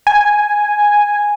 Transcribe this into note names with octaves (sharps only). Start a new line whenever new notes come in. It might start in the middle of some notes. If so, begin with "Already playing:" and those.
G#5